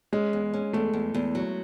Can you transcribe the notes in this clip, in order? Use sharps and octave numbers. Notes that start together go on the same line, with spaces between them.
G#3 C#4
E2
C#4
E2 A3
E2
E2
F#3